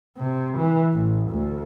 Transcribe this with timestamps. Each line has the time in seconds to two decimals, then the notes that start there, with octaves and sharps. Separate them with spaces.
0.17 C3
0.58 E3
0.94 A1
1.29 D2